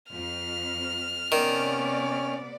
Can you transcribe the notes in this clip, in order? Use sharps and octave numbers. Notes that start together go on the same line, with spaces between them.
F2 F6
C3 D#3 B3 C#4 D5